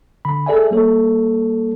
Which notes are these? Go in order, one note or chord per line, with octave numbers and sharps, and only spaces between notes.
D3 B5
G#4 A4 D5 E5 G#5
G3 A#3 A4 C#5